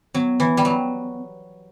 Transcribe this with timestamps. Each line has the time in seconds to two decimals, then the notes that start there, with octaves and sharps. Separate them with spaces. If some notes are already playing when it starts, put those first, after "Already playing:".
0.14 F#3 B3
0.40 E3
0.57 G3
0.65 F#3